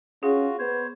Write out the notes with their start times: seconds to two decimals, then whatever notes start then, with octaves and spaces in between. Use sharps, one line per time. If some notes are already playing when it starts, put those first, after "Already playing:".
0.23 C#4 F4 F#4 G#4
0.59 B3 C5 C#5